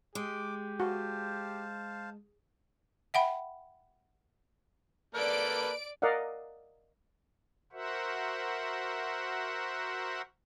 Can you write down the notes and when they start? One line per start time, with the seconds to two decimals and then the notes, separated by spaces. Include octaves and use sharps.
0.15 G#3 G4 D6
0.80 F#4 C5 F5 A5
3.14 E5 F#5 G5 B5
5.15 A#3 A4 B4 D5 D7
6.02 A#4 D5 D#5 F5 F#5
7.73 F#4 A#4 C5 E5 F#5